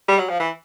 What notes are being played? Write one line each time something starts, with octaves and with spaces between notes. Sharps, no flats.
G3
F#3
F3
E3